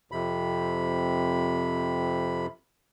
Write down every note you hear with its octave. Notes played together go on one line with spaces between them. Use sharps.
F2 C3 B5